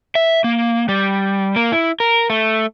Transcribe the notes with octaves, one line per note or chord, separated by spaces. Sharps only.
E5
A#3
G3
A#3
E4
A#4
A3